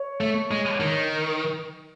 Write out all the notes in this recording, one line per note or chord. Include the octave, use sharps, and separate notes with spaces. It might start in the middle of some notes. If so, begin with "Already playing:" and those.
Already playing: C#5
A3
G#3
D#3